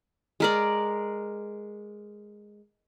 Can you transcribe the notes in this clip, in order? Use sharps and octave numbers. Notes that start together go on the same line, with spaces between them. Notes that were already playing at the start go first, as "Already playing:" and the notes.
G#3 A#4 D5